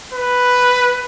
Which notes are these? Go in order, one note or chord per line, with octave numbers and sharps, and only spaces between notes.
B4